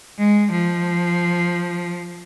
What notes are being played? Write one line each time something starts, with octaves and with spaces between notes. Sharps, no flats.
G#3
F3